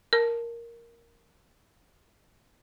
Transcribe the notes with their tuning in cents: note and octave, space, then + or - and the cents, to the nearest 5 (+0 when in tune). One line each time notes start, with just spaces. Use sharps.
A#4 +0 A5 +0